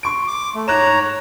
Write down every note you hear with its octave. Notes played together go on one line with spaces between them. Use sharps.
C6 C#6 D7
D6
A3
G#2 C#5 A#5 F#6 E7